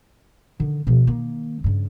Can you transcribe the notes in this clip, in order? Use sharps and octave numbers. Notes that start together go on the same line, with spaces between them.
D3 D#3
B2 F3
D#3 A#3
G2 C#3